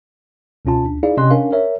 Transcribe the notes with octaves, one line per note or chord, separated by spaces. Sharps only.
C#2 B2 C#4 F4 A5
D2 D4
D#4 E4 G#4 D5 F5
C3 C#4 G4 D#5 C6 F#6
C#4 D4 A#4 F5
A#4 C#5 E5